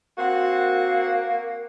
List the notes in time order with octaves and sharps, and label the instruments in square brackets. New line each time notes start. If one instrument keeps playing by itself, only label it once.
[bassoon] A#3 [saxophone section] C4 F#4